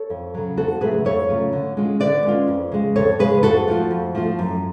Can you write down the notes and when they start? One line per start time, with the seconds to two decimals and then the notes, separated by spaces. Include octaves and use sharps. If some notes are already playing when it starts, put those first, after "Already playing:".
Already playing: A4 C#5
0.10 F2
0.34 C#3 F#3
0.57 F2 F#4 A4
0.81 C#3 F#3 A3 F4 G#4 B4
1.05 F2 A4 C#5
1.29 C#3 F#3 A3 F4
1.53 D3
1.77 G#3 C#4 F4
2.00 D3 B4 D5
2.25 G#3 C#4 F4
2.48 F2
2.72 C#3 G#3
2.95 F2 A4 C#5
3.19 C#3 G#3 G#4 B4
3.43 F2 F#4 A4
3.68 F3 A3 F4
3.91 F2
4.15 F3 A3 F4
4.39 F#2